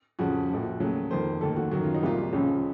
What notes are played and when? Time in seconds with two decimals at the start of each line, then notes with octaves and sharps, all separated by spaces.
0.19 F2 C#3 F3 F#4
0.50 A#1 A#2 F3
0.80 D#2 C#3 F#3 A3
1.11 F2 D#3 A#3 C5
1.41 D#2 D#3 A3 A4
1.56 F#4
1.71 F#2 D#3 F#3 F#4
1.83 F4
1.94 D#4
2.02 C2 C3 F3 A#3 F4
2.33 C#2 C#3 F3 C#4